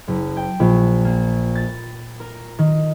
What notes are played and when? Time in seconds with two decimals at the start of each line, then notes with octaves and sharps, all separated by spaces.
0.08 F#1
0.37 G5
0.60 A#1
1.05 A#3
1.55 A6
2.20 A#4
2.59 D#3